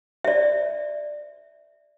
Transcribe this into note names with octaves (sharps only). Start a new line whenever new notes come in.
D5 E5